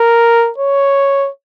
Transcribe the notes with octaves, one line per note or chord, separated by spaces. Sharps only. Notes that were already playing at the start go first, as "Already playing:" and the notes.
Already playing: A#4
C#5